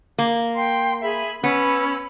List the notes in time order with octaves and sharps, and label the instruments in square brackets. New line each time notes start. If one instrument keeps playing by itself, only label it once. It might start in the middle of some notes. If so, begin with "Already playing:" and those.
[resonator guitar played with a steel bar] A#3
[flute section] G5 C6
G#4 E5 B5
[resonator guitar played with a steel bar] B3 [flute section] C#4 B5 E6